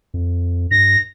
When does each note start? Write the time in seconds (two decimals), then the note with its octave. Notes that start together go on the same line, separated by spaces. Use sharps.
0.14 F2
0.71 G2 A#6